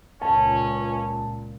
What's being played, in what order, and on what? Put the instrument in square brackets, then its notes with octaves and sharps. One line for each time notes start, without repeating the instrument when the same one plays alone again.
[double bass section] C#2 A#2 [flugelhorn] C#4 [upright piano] A5